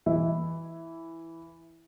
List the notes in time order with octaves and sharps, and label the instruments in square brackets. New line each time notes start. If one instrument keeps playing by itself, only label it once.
[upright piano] E3 E4